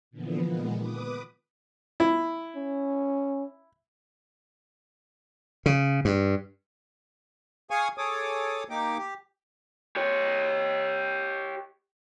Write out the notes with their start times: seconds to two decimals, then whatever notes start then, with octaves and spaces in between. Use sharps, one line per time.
0.11 A#2 D3 E3 F3 B3
0.47 A#2 D#3 G#3 B3
0.78 B4 D6 D#6
2.00 E4
2.56 C#4
5.66 C#3
6.05 G2
7.71 G#4 F5 G#5 C#6 D#6
7.98 G#4 A4 C#5 D6 D#6
8.69 A#3 D#4 G4 D6
8.98 G4
9.96 G4 C#5